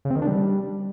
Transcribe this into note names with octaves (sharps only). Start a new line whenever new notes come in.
C#3
C4
D#3
D4
G3